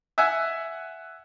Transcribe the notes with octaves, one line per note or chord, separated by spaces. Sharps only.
E5 F#5 G#5